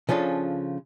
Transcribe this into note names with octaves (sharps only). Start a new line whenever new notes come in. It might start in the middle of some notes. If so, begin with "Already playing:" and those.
C#3 F3 C#4 D4 F4 A4